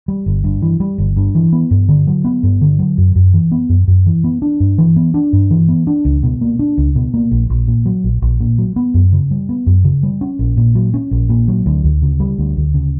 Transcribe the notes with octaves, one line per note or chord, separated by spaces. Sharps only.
G3
G1
G2
E3
G3
G1
G2
E3
B3
G2
D3
F#3
B3
G2
D3
F#3
F#2
F#2
E3
B3
F#2
F#2
E3
B3
D4
G2
E3
B3
D4
G2
E3
B3
D4
C#2
B2
A#3
D4
C#2
B2
A#3
A#1
A#1
A#2
F#3
A#1
A#1
A#2
F#3
B3
F#2
C#3
G3
B3
F#2
C#3
G3
C#4
A#1
A#2
F#3
C#4
A#1
A#2
F#3
D2
D2
C#3
G3
D2
D2
C#3